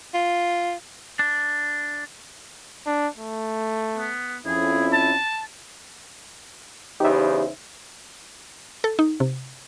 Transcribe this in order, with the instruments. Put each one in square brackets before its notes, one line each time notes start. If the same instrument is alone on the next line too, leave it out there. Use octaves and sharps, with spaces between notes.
[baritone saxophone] F4
[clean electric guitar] D4
[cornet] D4
A3
[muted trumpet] B3
[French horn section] F2 C#4 [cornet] E4 [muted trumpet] G#4
[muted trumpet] A5
[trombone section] E2 C#3 C5 [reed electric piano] D#4 E5 [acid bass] G4
[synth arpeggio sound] A4
D#4
C3